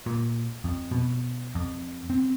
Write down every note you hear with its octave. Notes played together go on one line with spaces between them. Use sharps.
A#2
F2
B2
F2
C4